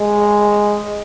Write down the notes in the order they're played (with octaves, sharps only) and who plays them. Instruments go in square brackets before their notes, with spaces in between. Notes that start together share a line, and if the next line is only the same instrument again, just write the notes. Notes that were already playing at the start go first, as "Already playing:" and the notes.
Already playing: [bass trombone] G#3